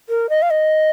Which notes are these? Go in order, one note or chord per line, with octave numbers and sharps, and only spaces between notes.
A#4
D#5
F5
D#5